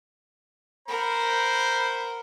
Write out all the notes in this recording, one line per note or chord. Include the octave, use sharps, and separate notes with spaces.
A#4 C5 F#5 B5